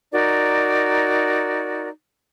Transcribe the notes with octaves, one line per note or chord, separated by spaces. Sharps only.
D#4 F#4 A#4 D5